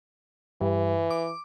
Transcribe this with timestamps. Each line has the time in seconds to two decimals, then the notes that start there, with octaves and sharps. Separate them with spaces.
0.61 G2 E3
1.11 D6